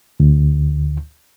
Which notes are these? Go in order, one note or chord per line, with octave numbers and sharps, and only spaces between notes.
D2